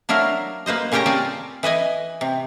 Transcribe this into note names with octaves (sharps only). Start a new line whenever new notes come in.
F#3 D4 E4 A#4 F5
A#3 B4 C5 D#5
A#2 C#3 C#4 G4 G5 A#5
C4 F4 D5 G#5 A5
E3 B4 D#5 G#5
C3